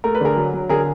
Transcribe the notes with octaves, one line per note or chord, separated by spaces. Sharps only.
A3 A#4
B4
D3 G#4 A#4
F#3
F#3
D3 G#4 A#4